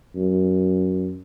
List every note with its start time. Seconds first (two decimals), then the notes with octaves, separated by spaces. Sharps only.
0.15 F#2